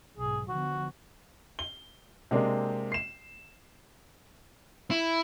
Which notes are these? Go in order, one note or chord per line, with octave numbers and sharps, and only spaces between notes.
B1 G#2 G#4
D3 F3 B3 F#4
G7
C3 G#3 A#3 C4 D4
C7 E7
E4